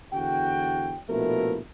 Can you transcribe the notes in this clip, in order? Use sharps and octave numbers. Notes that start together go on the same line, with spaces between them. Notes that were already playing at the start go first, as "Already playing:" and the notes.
E2 D3 F#4 G5
A#1 B2 F3 A3 E4 A#4